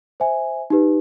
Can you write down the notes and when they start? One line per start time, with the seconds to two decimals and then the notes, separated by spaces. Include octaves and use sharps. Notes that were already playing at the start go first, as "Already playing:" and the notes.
0.20 C5 E5 G#5
0.70 D#4 G4 B4